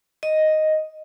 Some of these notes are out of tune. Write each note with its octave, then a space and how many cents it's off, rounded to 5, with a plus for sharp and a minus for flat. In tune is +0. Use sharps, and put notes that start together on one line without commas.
D#5 +0